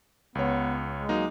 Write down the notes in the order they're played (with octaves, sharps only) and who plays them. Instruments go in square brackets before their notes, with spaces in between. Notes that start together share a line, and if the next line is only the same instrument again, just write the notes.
[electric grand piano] C#2 C#5 [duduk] B3
[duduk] G#3
[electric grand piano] F#3 A#3 D#4